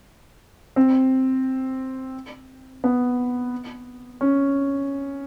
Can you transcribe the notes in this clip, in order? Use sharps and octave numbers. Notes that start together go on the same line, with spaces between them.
C4
B3
C#4